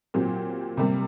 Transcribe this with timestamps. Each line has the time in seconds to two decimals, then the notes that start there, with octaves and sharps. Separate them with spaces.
0.14 A#2 F#3 C4 G4
0.77 C3 G3 A#3